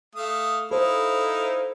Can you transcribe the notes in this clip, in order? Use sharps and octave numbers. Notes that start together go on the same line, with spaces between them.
A3 F5 D#6
D#4 E4 A4 C5 F5